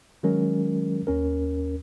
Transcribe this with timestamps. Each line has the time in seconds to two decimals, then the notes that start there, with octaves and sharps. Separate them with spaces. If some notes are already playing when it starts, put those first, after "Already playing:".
0.23 D#3 F#3 G#3 C#4 A#4
1.07 D#2 C#4 A#4